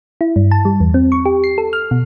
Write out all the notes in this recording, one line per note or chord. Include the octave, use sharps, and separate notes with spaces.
E4
G2
A5
G3
E2
C4
C#6
G4
C7
A4
F6
B2